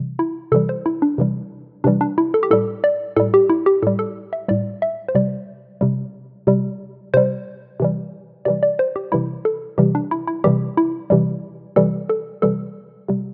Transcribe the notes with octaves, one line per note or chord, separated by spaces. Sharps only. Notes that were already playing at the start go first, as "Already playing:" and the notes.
Already playing: C3 E3 G3
E4
C3 E3 G3 A4
C5
E4
D4
C3 E3 G3
C3 E3 G3 D4
D4
E4
A4
G4
A2 G3 A4
D5
A2 G3 A4
G4
E4
G4
A2 G3 A4
A4
E5
A2 G3 D5
E5
C5
C3 G3 D5
C3 G3
C3 G3
C3 G3 C5
C3 E3 G3
C3 E3 G3 D5
D5
C5
G4
C3 E3 G3 E4
A4
C3 E3 G3 G4
D4
E4
E4
C3 E3 G3 G4
E4
C3 E3 G3
C3 E3 G3 A4
A4
C3 E3 G3 A4
C3 G3